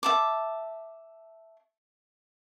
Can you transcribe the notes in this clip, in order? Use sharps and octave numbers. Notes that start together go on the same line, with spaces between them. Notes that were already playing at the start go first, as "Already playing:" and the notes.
E5 A5 D6